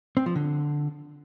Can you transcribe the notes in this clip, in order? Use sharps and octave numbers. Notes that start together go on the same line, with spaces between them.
C4
F3
D3